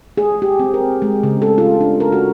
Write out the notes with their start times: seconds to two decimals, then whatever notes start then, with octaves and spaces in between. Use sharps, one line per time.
0.17 G#4
0.42 G4
0.59 C4
0.74 A#4
1.02 G#3
1.23 C#3
1.42 A4
1.58 F4
1.81 D4
2.00 A#4
2.12 F#4